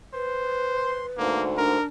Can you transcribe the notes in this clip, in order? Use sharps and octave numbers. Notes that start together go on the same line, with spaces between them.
B4 C5
C6
D2 G#2 D3 A#3
D4 A#4